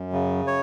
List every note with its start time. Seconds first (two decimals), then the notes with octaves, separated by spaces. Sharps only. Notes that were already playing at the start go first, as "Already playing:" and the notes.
Already playing: F#2
0.13 C#3
0.47 C#5